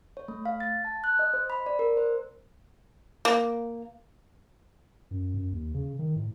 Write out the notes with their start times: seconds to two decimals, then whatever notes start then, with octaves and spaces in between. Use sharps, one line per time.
0.17 C#5
0.28 A3
0.45 F5
0.60 A6
0.85 A5
1.04 F#6
1.19 D#5
1.34 C5
1.50 B5
1.66 D5
1.79 A#4
1.97 C5
3.25 A#3
5.11 F#2
5.34 F#2
5.52 D#2
5.74 C#3
5.99 D#3
6.16 A2